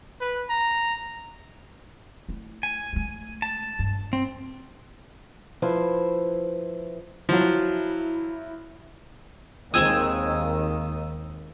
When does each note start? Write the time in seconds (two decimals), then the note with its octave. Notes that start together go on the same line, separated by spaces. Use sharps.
0.21 B4
0.49 A#5
2.29 A3 E4
2.63 G#5
2.93 G#3 A3
3.42 A5
3.79 G2
4.13 C4
5.62 F3 E4 B4 C5
7.29 F3 F#3 E4
9.74 D#2 D#3 G#3 C4 G#5 D#6 E6